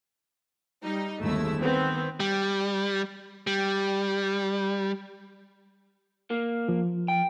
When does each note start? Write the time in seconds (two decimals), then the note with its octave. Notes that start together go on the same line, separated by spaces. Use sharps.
0.83 G3 D#4
1.21 G1 D#2 G#3 A3 E4 E6
1.61 D#3 B3 C4
2.20 G3
3.47 G3
6.30 A#3
6.69 F3
7.08 G5